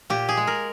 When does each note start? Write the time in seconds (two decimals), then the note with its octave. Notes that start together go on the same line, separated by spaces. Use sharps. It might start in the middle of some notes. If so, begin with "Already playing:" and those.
0.10 A#2 G4
0.29 G#4
0.37 G#3
0.47 A#4